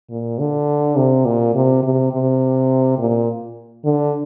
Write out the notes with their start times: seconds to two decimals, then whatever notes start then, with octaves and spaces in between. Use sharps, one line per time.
0.10 A#2
0.39 D3
0.96 C3
1.25 A#2
1.55 C3
1.83 C3
2.12 C3
2.98 A#2
3.84 D3